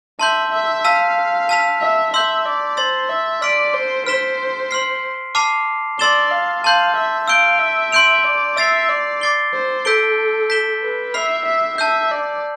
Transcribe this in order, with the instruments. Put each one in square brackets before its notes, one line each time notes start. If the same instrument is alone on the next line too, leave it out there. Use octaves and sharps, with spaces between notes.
[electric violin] E5 [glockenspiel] A5 C6 G6
[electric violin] E5
[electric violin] F5 [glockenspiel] A5 E6 B6
[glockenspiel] A5 E6 B6 F7
[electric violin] E5
[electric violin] E5 [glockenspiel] C6 E6 G6
[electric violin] D5
[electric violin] C5 [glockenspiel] C6 E6 A6
[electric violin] E5
[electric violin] D5 [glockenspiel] C6 F6 B6 D7
[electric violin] C5
[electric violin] C5 [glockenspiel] F6 B6 E7 G7
[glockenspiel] C6 F6 C7
A5 D6 F6 C7 F7
[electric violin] D5 [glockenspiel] C6 E6 A6 E7 G7
[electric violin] F5
[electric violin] F5 [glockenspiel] A5 C6 G6
[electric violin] E5
[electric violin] F5 [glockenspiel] E6 G6 D7 G7
[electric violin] E5
[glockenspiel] C6 G6 D7 F7
[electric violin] D5
[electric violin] E5 [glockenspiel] E6 A6 C7 F7
[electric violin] D5
[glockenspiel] D6 A6 C7 G7
[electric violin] C5
[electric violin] A4 [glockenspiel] E6 G6 B6 D7 G7
[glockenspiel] G6 B6 E7 G7
[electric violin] B4
[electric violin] E5 [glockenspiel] B5 F6 C7
[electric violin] E5
[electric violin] E5 [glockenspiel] A5 E6 G6
[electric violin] D5